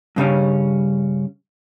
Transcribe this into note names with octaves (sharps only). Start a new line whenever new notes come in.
G2 C#3 G3 C#4